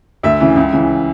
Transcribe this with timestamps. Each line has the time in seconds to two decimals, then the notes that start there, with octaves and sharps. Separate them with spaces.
0.23 D2 E5
0.40 C#3 E3
0.56 C#2
0.72 C#3 E3